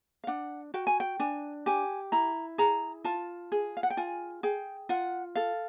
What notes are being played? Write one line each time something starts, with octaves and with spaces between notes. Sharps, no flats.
F5
D4 F#5
F#4 G5
G#5
G5
D4 G#5
G4 G#5
E4 A#5
G#4 A#5
F4 A5
G#4
F5
F#5
G5
F4 G#5
G#4 G5
F4 F#5
A4 F5